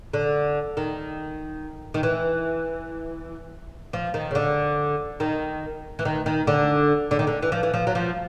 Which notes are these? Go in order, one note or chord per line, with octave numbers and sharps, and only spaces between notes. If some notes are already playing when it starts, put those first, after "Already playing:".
D3
D#3
D#3
E3
F3
D#3
C#3
D3
D#3
E3
D#3
D#3
D3
D3
D#3
D3
E3
F3
E3
F3
F#3
F3